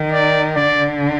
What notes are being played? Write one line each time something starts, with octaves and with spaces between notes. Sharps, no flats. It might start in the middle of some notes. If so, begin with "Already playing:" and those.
Already playing: D#3
D5
D3 D5